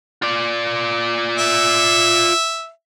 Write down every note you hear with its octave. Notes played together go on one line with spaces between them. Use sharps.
F4 D5
E5